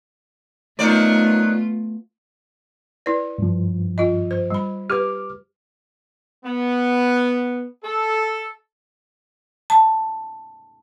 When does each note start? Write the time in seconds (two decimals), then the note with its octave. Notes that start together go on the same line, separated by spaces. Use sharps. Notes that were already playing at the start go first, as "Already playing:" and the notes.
0.79 D#3 F#3 A3 B3 F4 D5
3.06 E4 B4 D5
3.38 G2 F3
3.98 F4 D#5
4.31 C5
4.51 G3 B5
4.90 G4 B4 D6 F6
6.45 B3
7.84 A4
9.70 A5